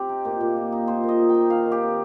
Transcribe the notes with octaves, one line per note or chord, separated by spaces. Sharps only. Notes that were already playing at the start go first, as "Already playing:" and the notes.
Already playing: C4 G4
D#4
A#2
A#2
A#3
D#4
A#2 C5
A#2
D#5
A#3
G5
D#4
D#3 F5
D#3
G4
C4